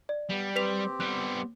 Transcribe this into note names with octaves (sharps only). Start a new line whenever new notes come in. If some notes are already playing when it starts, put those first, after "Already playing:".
D5
G3 B3
C4 G4 B4 B6 F7
G3 B3 F#6